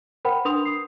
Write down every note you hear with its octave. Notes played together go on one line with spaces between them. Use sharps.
A#4 C5 F#5 G5 B5
D4 A#4 B4 C6 D#6 F7
D#6 C7